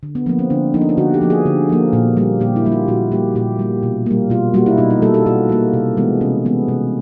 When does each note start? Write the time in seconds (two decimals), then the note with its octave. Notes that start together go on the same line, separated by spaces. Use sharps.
0.03 D3
0.15 B3
0.26 F3 A#3 B3
0.39 C4
0.50 D3 D4
0.74 F3 A#3 D#4
0.81 D4
0.89 D#4
0.97 D3 F#4
1.14 G4
1.21 F3 A#3
1.30 G#4
1.46 D3
1.70 F3 A#3
1.93 A#2
2.17 G3 A#3
2.40 A#2 G4
2.56 E4
2.65 G3 A#3
2.72 F4
2.88 A#2 F#4
3.12 G3 A#3 G4
3.35 A#2 G4
3.59 G3 A#3
3.83 B2
4.06 G3 A#3
4.30 B2 F4
4.54 G3 A#3 F#4
4.66 E4
4.78 B2 D#4
4.90 D#4
5.02 G3 A#3 A4
5.14 A4
5.26 B2 F#4
5.49 G3 A#3
5.73 C3
5.97 E3 G#3 B3
6.21 C3 C#4
6.45 E3 G#3 B3
6.68 C3